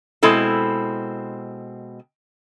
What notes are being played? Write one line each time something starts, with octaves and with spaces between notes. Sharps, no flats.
B2 G#3 C4 E4 A4